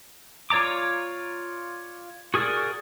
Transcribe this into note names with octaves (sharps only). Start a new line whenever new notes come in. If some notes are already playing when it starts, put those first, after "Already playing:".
F4 C#5 D5 A#5 D6
F#4 G#4 A#4 D5